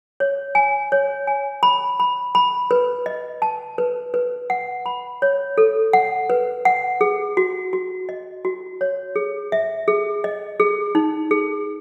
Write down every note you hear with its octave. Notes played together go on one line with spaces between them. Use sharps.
C#5
G#5
C#5
G#5
B5
B5
B5
B4
D#5
A5
B4
B4
F#5
B5
C#5
A4
F#5
B4
F#5
G#4
F#4
F#4
D#5
F#4
C#5
G#4
E5
G#4
D#5
G#4
D#4
G#4